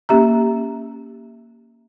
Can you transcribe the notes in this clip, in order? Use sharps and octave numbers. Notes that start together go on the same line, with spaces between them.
A#3 C#4 G4 E5 A#5